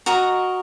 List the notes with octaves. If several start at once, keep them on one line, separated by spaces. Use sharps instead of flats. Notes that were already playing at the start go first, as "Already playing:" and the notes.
F#4 A#4 D#5 A#5